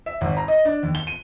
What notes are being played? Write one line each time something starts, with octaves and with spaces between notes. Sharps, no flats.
E5
G#1
A#5
D#5
D4
D#2
G7
D#7